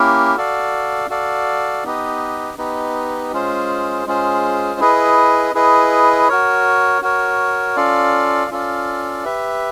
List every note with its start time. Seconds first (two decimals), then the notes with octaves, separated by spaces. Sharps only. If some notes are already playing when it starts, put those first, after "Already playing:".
Already playing: A#3 C#4 E4 G4 A#4
0.36 F#4 A4 D5 F5
1.09 F#4 A4 D5 F5
1.84 B3 D#4 G4 B4 D#5
2.58 B3 D#4 G4 B4 D#5
3.32 G#3 C#4 F4 G#4 C5
4.06 G#3 C#4 F4 G#4 C5
4.80 E4 G#4 B4 D#5
5.54 E4 G#4 B4 D#5
6.29 F#4 A#4 C#5
7.02 F#4 A#4 C#5
7.76 C#4 F4 A4 D5 F5
8.51 C#4 F4 A4 D5 F5
9.25 G4 B4 E5